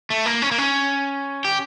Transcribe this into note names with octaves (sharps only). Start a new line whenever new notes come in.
A3
A#3
C#4
A#3
C#4
G4